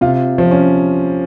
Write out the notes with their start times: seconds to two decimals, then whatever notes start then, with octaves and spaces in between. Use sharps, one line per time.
0.01 C3 F4
0.38 F3
0.51 C#4